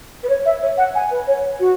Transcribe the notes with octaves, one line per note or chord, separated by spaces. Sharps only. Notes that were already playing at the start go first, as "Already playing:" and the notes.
B4
C#5
E5
C#5
F#5
G#5
B4
C#5
F#4